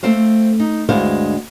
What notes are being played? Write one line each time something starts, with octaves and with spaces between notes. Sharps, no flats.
A3 C4 C5 F5
D#4
D2 G2 G#3 E4 C5 F5